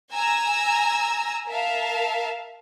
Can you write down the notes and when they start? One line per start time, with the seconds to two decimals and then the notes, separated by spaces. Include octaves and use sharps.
0.12 G#5 A#5 E6
1.48 A#4 E5 F5 A5